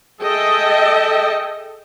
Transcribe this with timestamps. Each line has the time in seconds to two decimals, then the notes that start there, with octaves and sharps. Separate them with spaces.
0.21 G#4 A4 D#5 E5 G5